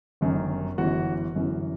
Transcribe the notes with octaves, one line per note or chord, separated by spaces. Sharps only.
G1 F#2 D#3
G1 F#2 E3 F#4
G1 F#2 E3